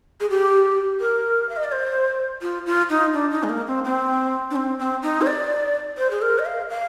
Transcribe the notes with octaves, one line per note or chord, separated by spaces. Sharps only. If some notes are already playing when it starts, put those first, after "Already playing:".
G#4
G4
A#4
F5
D#5
D5
C5
F4
F4
D#4
D4
D#4
G#3
A#3
C4
C4
D4
C4
C4
D#4
C5
D5
C5
G#4
A#4
D#5
F5
F5